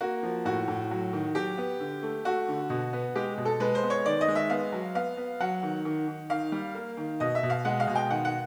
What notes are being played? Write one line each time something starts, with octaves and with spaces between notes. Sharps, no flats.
A#3 F#4
F3
A2 F#4
A2
F#3
D#3
F#3 G4
B3
D3
A3
A3 F#4
D3
B2
B3
G#3 G4
B2
A4
G#3 B4
C5
B3
C#5
D#3 D5
D#5
G#3
E5
B3 F5
F#3
B3 F5
B3
F#3 F#5
D#3
D#3
D#3
D#3 F5
G3
A#3
D#3
B2 D#5
E5
B2
F5
G#3 F#5
F5
B2
G5
D#3 F#5
F#5